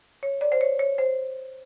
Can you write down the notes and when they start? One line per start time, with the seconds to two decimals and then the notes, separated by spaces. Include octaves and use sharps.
0.23 C#5
0.41 D5
0.52 C5
0.61 C#5
0.79 C#5
0.98 C5